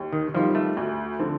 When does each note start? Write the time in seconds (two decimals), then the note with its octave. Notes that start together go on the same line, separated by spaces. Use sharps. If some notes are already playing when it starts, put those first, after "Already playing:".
Already playing: D#2
0.13 D#3
0.34 D#3 F3 G3 C4 F4
0.55 A3
0.77 D2
1.19 D3 F3 C4